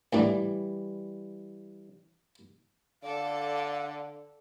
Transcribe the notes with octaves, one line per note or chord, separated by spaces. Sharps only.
D2 A2 D3 E3 G3
D3 A4 D5 F5